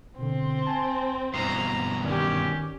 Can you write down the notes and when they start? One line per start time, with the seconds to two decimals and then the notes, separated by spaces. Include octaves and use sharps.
0.19 B2 D3 C4
0.67 G#5 A5
1.34 G2 B2 E3 A#5 C7
2.04 D#3 C#4 G4 D5 G#5